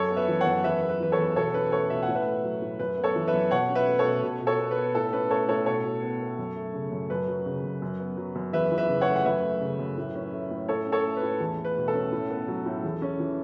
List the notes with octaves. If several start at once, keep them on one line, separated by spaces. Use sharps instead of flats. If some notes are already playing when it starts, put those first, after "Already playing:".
Already playing: F#2 A4 C#5
B3
B4 E5
E3
C#5 F#5
F#2
E2 B4 E5
B3
B4
E3 B4
A4 C#5
E2
B2 A4 C#5
C#4 B4
A3 A4 C#5
B2 E5
F#5
A2
B4 E5
A3
F#3
A2
F#2 B4
B3
A4 C#5
E3
B4 E5
F#2
B2 C#5 F#5
C#4
B4 E5
A3
A4 C#5
B2
B2
B2
A4 C#5
B3
B4
B3
A2 A4
C#4 B4
A3 A4 C#5
A2 A4 C#5
B2 A4 C#5
B2
B3
B3
F#2
A3
C#3
F#2
F#2 B4
F#3
C#3
F#2
F#2
B3
F#3
F#2
E2 B4 E5
E3
B4 E5
C#3
C#5 F#5
A3
F#5
F#2 B4 E5
A3
C#3
F#2
A2
C#4
A3
A2
A2 A4 C#5
C#4
A4 C#5
A3
B4
A2
E2
A3
B4
B2
A4
C#4
A2
B3
F#3
A2
E2
C#4
E3